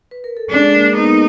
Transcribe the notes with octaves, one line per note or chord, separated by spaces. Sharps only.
B4
A#4
A4
G#3 D4 G#4
A#3 A#4
B3 D#4 B4